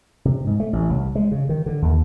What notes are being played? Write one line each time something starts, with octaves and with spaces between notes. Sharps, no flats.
C3
G#2
A3
A1
C2
G#3
C#3
D#3
D3
D#2